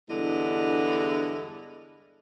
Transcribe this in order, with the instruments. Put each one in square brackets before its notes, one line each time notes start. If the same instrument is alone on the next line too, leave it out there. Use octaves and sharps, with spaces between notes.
[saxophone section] E2 G2 D3 G#3 E4 D#5